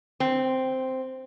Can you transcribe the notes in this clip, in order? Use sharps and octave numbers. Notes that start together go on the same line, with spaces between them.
C4